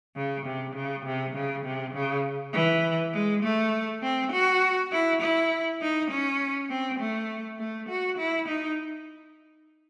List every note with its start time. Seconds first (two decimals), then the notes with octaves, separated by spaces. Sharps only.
0.16 C#3
0.46 C3
0.75 C#3
1.06 C3
1.35 C#3
1.65 C3
1.94 C#3
2.53 E3
3.13 G#3
3.43 A3
4.03 C4
4.32 F#4
4.92 E4
5.22 E4
5.82 D#4
6.11 C#4
6.70 C4
7.00 A3
7.59 A3
7.89 F#4
8.18 E4
8.48 D#4